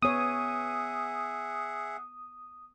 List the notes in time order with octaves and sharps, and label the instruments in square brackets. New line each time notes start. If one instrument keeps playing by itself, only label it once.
[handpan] B3 C#5 [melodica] G#4 E5 F#5 [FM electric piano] D#6